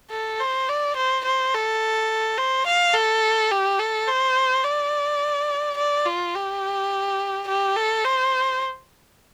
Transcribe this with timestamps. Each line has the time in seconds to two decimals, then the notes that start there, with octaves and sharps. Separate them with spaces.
0.11 A4
0.40 C5
0.69 D5
0.96 C5
1.25 C5
1.54 A4
2.38 C5
2.66 F5
2.94 A4
3.51 G4
3.79 A4
4.07 C5
4.64 D5
5.77 D5
6.06 F4
6.34 G4
7.48 G4
7.76 A4
8.04 C5